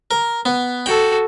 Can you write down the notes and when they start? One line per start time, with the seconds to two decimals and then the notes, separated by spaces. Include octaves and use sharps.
0.11 A#4
0.45 B3
0.86 F#4 A4 G5